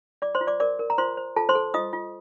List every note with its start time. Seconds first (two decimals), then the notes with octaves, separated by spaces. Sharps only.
0.22 F4 D5 D6
0.35 C5 C6
0.41 F4
0.47 D5 D6
0.60 A#4 D5 D6
0.79 A#4
0.90 A#5
0.98 F4 C5 C6
1.17 C5
1.36 F4 A4 A5
1.49 C5 C6
1.55 A4
1.74 F4 D#5 D#6
1.93 F4